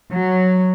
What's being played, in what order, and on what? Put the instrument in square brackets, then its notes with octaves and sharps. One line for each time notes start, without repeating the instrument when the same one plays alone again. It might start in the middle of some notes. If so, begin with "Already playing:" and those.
[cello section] F#3